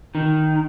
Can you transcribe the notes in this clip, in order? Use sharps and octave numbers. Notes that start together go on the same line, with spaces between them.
D#3